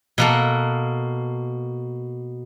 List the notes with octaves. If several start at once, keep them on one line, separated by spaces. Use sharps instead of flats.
B2 A#3 A4